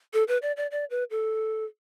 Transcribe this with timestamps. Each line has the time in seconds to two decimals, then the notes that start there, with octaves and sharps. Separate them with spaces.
0.14 A4
0.28 B4
0.42 D5
0.57 D5
0.71 D5
0.90 B4
1.11 A4